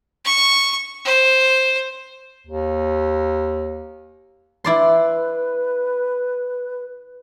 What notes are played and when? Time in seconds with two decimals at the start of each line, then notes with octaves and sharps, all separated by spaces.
0.25 C#6
1.05 C5
2.47 D#2
4.64 E4 B4 D5 C6